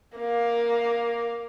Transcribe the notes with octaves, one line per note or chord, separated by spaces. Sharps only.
A#3 F5